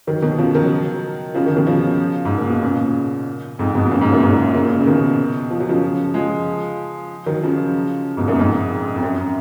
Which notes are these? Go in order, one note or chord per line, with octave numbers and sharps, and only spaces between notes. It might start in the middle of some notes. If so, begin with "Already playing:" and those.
D#3 F#3
B2 D#3
F#3
C#3 F3
D#3 F#3
C#3 F3
D#3 F#3
B2 D#3
C#3 F3
G#2
A#2
B2
A#2 C#3
F2 G#2
G#2 B2
B2
A#2 C#3
G#2 B2
F#2 A#2
G#2 B2
A#2 C#3
A#2 C#3
C#3
B2 D#3
F3
F#3
C#3 F3
F3 G#3
D#3 F#3
C#3 F3
G#2 B2
F#2 A#2
F2 G#2
F2
F#2